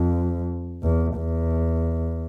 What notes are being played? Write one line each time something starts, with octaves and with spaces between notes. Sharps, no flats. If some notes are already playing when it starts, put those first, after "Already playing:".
Already playing: F2
E2
E2